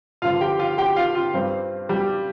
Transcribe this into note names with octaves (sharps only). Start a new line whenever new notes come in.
G2 D3 F3 F4 F5
G4 G5
F4 F5
G4 G5
F4 F5
F4
G2 G3 C4
G3 G4